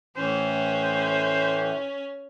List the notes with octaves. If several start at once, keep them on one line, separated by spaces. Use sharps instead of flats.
A2 E3 C#4 C5